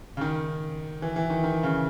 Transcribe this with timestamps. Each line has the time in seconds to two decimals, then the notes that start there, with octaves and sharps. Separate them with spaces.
0.17 C#3
0.21 D#3
1.02 E3
1.16 E3
1.30 D#3
1.44 D#3
1.63 C#3